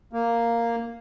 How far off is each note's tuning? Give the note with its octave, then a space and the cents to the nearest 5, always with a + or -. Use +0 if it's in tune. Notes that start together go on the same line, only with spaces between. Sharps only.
A#3 -5